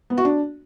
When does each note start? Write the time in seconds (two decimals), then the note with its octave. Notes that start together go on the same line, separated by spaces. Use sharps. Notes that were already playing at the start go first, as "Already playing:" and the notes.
0.10 B3
0.18 F#4
0.25 D4